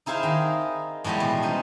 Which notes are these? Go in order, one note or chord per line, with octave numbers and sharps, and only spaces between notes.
D#4 E4 G#4 C5 F5
D#3 D#4
A2 E3 G3 G#3 B3
B2
C#4 D#4 B4 C5